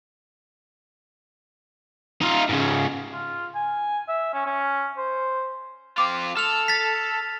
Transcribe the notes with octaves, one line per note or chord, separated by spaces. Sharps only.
D#4 F4
G#2 C#3
F4
G#5
E5
C#4
C#4
C5
C4 F4 D6
A4 F6 F7
A6 B6